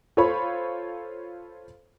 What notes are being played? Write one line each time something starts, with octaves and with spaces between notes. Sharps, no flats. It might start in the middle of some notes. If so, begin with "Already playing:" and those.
F4 A4 C5 C#5 F5 B5